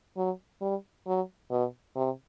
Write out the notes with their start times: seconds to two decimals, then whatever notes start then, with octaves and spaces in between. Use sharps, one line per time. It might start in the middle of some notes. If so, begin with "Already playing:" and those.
0.17 F#3
0.62 G3
1.07 F#3
1.51 B2
1.96 C3